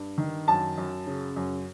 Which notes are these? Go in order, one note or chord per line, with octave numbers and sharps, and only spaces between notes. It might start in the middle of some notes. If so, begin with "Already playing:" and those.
Already playing: G2
D#3
F#2 A5
F#2
C#3
F#2